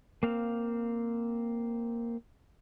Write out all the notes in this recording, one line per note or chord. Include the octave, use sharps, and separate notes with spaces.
A#3 C4 F5